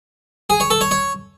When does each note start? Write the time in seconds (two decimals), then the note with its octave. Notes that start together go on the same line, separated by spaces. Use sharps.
0.50 G#4
0.60 C#5
0.70 A4
0.81 C#5
0.91 C#5